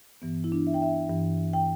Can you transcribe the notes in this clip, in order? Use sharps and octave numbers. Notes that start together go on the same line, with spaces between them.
G2 E3 B3
E4
D4
E5
G5
E5
G2 E3
G5